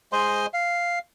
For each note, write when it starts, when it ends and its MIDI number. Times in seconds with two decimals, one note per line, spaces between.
0.13 0.46 56
0.13 0.46 72
0.13 0.46 75
0.13 0.46 84
0.54 0.99 77